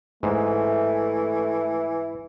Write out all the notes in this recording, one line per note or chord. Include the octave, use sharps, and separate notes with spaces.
G#2 E3 A3